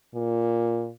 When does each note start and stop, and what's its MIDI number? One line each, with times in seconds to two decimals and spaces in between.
0.15 0.90 46